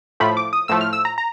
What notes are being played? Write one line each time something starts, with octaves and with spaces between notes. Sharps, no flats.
A2 F3 A3 B5
D6
D#6
A2 F3 A3 E6
F6
E6
A#5
A#5